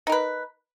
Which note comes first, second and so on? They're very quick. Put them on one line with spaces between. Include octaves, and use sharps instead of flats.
D#4 A#4 B4